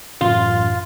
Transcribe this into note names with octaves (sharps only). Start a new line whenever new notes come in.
A1 F#2 F4